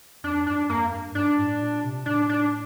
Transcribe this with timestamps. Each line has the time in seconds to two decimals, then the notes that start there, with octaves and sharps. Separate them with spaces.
0.23 F2 D4
0.46 G2 D4
0.69 F2 A#3
0.92 G2
1.15 G2 D4
1.38 A2
1.61 A#2
1.84 C3
2.06 A2 D4
2.29 D4